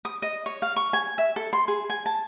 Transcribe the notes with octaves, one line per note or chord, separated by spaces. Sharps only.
D#6
D#5
C#5
F5
C#6
G#5
E5
A4
C6
G#4
G#5
A5